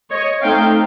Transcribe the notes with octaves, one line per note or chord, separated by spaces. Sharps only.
C#5 D#5
A3 C4 D#4 F5 G5